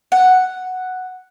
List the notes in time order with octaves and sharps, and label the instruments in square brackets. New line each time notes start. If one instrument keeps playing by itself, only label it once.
[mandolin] F#5